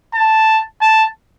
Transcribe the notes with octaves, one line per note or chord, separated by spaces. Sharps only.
A5
A5